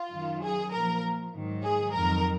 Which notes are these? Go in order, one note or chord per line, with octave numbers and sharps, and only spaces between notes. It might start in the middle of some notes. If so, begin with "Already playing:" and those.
Already playing: F4
F#2 D#3 F#3
G#4
A#2 F3 A#4
G#2 D#3 F#3
G#4
F2 D#3 F#3 A#4